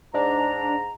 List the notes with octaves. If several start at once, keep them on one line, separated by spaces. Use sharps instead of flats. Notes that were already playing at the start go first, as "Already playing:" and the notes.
G#2 D4 A#5